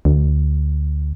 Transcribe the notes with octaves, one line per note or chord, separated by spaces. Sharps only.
D2